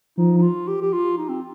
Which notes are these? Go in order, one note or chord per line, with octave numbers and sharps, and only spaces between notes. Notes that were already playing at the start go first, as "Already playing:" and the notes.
F3 D#4
D#4
F4
G4
G4
F4
D#4
C4